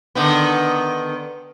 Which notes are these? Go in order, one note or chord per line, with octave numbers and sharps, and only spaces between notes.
D3 D#3 B3